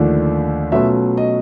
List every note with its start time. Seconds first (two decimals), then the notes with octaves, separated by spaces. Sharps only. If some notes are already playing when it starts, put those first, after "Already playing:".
Already playing: D#2 D3 F3 A3 D4
0.72 B2 F#3 A3 C#4 F4 E5
1.17 D#5